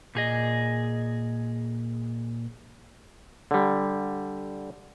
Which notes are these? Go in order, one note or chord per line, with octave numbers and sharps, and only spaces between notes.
A#2 G#4 D#5
D3 G3